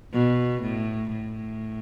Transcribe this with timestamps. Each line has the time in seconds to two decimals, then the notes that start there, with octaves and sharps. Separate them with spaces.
0.13 B2
0.62 A2
1.12 A2